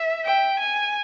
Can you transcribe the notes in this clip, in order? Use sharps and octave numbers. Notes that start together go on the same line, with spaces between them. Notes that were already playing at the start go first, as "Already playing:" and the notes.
Already playing: E5
G5
G#5